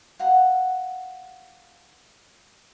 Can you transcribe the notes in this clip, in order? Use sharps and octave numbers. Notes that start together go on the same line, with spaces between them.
F5 F#5 A#5